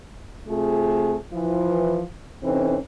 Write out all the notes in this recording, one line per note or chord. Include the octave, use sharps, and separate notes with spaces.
C3 A3 F4 G#4
E3 F3
C3 E3 C4 C#4 D#4 A4